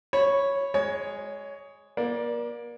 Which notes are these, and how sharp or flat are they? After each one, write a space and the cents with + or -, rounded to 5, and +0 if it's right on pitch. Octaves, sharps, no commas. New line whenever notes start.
C#5 +0 B5 +0
G#3 +0 C#5 +20
A#3 +35 D5 +0